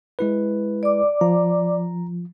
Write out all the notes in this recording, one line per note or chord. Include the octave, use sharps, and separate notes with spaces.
G#3 E4 B4
D5 D6
F3 A#5